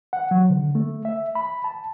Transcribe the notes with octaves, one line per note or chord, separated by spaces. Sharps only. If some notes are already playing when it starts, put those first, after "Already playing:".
F#5
F#3
D3
A3
E5
B5
A5